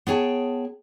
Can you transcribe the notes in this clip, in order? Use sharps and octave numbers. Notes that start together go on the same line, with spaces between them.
B3 G#4 C#5 G5 A5